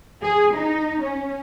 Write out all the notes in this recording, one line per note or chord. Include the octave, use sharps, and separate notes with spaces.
G#4
D#4
C#4